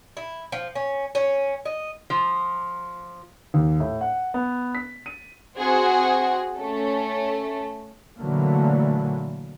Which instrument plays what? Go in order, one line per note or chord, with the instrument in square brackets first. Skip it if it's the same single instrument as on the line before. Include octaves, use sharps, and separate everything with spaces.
[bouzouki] E4
F3
C#4
C#4
D#5
[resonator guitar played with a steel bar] F3
[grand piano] D#2
A2
F#5
B3
B6
D#7
[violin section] C4 F#4 G#4 C5 F#5 G#5
A3 C#4 A4
[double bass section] A#2 D3 E3 F#3 A3 A#3